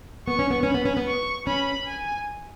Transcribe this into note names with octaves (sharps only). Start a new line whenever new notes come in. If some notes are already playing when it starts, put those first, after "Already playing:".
B3 C#6
C#4
B3
C#4 B5
B3
C#4
B3
C#6
C#4 B5
G#5